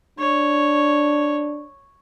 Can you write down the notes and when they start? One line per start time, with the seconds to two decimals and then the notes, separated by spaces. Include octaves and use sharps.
0.19 D4 C#5